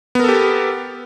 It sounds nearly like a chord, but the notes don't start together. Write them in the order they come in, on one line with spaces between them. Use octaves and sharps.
B3 A#4 A4 G4